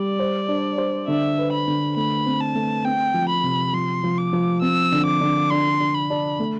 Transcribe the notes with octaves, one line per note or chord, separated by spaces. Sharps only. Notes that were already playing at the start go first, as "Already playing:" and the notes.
Already playing: G3 D5
C5
D4
C5
D3 E5
B4
B5
D3
A3 B5
C4
A5
A3
C4 G5
F3
B5
C3
F3 C6
F3
D6
F3
C4 E6
D3
D6
D3
D4 C6
D4
B5
D4
A3